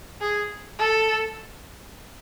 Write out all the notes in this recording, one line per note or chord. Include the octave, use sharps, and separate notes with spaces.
G#4
A4